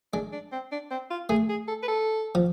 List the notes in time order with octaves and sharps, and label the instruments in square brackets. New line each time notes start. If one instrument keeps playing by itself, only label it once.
[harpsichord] G#3 [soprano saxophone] D4
[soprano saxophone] D4
C4
D4
C4
F4
[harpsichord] A3 [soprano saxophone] G#4
[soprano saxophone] G#4
A4
B4
A4
[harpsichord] F3